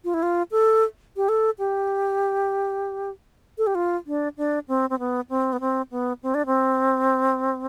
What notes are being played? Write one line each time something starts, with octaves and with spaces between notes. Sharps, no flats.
F4
E4
F4
A4
G4
A4
G4
A4
G4
F4
D4
D4
C4
C4
B3
C4
B3
C4
B3
C4
D4
C4